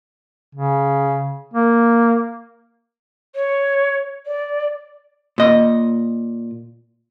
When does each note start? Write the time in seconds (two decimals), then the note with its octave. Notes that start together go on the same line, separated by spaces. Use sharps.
0.55 C#3
1.54 A#3
3.35 C#5
4.26 D5
5.38 A#2 D#5